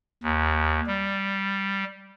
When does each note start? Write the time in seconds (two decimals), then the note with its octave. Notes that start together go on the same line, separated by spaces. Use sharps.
0.23 D#2
0.87 G3